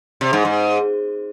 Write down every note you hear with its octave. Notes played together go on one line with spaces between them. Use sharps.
C3
G#2
G#2